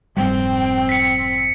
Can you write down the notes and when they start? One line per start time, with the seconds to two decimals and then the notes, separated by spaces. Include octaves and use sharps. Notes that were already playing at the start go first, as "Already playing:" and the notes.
0.17 F1 G#2 G3 C4 G5
0.89 B6 C#7